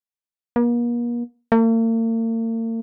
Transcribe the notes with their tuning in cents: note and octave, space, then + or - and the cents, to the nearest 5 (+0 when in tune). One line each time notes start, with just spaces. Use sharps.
A#3 +40
A#3 -45